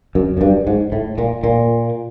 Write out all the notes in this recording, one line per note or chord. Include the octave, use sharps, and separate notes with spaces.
F#2
F#2
G2
G#2
A2
A#2
A#2